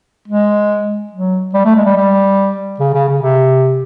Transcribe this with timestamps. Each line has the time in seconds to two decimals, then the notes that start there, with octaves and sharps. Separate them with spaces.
0.28 G#3
1.13 F#3
1.54 G3
1.65 A3
1.76 G#3
1.85 G3
1.96 G3
2.80 C#3
2.94 C#3
3.09 C#3
3.22 C3